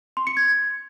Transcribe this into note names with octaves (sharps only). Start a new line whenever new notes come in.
C6
C#7
G#6